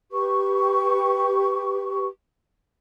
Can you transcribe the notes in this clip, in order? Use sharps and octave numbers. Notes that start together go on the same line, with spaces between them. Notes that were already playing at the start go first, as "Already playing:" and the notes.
G4 B4 C#6